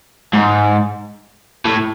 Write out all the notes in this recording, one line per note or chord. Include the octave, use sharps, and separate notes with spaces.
G#2
A2